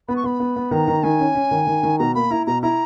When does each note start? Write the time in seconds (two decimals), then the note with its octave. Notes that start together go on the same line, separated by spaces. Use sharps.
0.08 B3 B5
0.16 C#6
0.24 B3 B5
0.40 B3
0.56 B3
0.71 D#3 A#5
0.88 D#3
1.03 D#3 G#5
1.20 C#4
1.35 C#4
1.51 D#3
1.67 D#3
1.83 D#3
1.99 B2 A#5
2.15 A#3 B5
2.31 E4 A#5
2.47 B2 A#5
2.62 E4 A#5